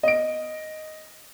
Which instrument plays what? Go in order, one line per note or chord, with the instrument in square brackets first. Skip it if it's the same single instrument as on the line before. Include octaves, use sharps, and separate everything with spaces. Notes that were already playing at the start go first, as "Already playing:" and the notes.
[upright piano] D#5 D7